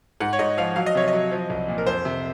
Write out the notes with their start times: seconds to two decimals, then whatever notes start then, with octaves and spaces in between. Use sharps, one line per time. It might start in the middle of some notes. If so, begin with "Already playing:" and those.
0.20 G#2 F#5
0.33 C#5
0.39 G#2 D#5
0.58 F3 F5
0.76 F#3 F5
0.86 D#5
0.95 C3 C#5
1.08 D#5
1.13 F#3
1.32 F3
1.50 C2
1.68 A#2
1.78 A#4
1.86 F2 C5
2.05 C3